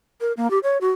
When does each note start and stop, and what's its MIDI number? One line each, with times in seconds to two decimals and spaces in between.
0.21 0.32 70
0.37 0.50 58
0.50 0.59 67
0.63 0.78 73
0.81 0.90 66